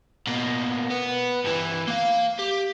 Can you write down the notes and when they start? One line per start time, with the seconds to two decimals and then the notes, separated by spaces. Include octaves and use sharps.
0.27 B2 A#3
0.91 B3
1.44 G2 E3
1.88 A#3 F5
2.39 G4